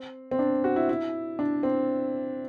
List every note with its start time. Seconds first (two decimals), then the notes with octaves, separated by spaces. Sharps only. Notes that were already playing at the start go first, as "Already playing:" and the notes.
Already playing: C4
0.31 C4
0.39 D4
0.64 F#4
0.76 E4
0.89 E4
1.39 D4
1.63 C4